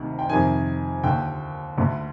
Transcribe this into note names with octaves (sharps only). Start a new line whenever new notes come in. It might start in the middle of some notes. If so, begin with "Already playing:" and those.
Already playing: D2 C3 D#3
G5
F2 C3 D#3 G#5
D#2 D3 G5
D2 D3